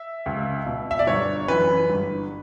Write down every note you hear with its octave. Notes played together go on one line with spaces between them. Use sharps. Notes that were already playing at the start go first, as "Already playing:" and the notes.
Already playing: E5
C#2
B2
E5
D5
G1 C#5
F#2 E3 B4
G1